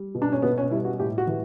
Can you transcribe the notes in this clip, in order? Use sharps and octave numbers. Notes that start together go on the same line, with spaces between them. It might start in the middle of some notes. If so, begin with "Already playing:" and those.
Already playing: G3
B2
D4
C#4
B2 B3
C#4
G3 E4
F#4
A2 G4
F#4
E3